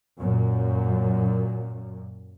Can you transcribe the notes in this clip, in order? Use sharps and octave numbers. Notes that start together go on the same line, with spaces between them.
F#2 A#2